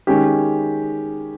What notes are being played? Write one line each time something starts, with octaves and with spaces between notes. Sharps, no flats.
D#3 G#3 C#4 G4